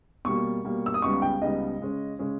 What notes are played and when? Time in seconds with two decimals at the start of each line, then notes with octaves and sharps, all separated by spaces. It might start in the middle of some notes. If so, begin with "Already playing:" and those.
0.25 B2 G3 A#3 C#6
0.64 B2 G3 A#3
0.86 E6
0.94 D#6
1.02 C#2 C#3 G3 B3 D#4 C#6
1.22 G5
1.41 C#2 C#3 G3 B3 D#4 D#5
1.80 C#3 G#3 C#4
2.19 C#3 G#3 C#4